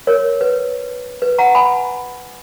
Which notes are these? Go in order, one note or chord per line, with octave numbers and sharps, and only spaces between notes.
A#4 C#5
B4
B4
F#5 A#5
G#5 B5